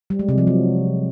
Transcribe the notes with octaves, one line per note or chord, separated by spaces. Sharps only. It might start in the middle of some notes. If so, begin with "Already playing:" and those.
G3
G#3
C3
F3
F#3